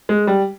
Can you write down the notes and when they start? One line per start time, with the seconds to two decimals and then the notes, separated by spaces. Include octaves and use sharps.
0.09 G#3
0.27 G3